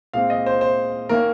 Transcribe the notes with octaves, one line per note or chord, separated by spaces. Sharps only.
A#2 G#3 C4 F5
D#5
C5
C5
D#3 A#3 C#4 A#4